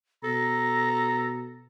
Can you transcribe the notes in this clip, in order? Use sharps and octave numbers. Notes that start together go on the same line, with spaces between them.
B2 A4 A#5 A#6